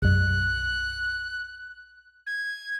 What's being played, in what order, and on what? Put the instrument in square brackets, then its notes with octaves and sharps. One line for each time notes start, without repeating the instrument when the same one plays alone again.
[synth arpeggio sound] B1 F#2 [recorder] F#6
[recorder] G#6